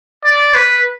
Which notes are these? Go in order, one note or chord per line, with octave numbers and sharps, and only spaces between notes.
D5
B4